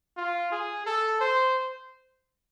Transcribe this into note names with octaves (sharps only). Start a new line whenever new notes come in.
F4
G#4
A4
C5